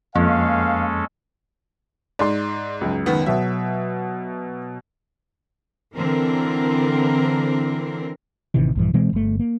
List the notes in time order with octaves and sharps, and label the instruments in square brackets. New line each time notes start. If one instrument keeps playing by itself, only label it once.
[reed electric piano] F2 [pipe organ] G#3 C#4 A4 [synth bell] A#3 [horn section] B3 F5
[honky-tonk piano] G#2 [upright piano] D5 C6
[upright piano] C#2 F#2
[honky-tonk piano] D#3 B3
[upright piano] B2 F#3 [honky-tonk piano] E5
[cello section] D3 E3 C4 A#4
[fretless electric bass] A1 C3 D#3 E3
A#1 G2 E3
B2 E3 G#3 C4
G1 A3
A#3